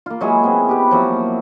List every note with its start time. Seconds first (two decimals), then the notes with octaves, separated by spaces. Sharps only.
0.06 A#3 F4
0.21 F#3 G#3 E4 G#4
0.44 B3 C4
0.69 G4 B4
0.91 F3 F#3 A#3 E4